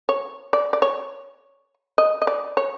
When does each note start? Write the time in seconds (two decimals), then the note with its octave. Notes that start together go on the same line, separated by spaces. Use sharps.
0.09 C#5
0.53 D5
0.73 D5
0.82 C#5
1.98 D#5
2.22 D#5
2.27 D5
2.57 C#5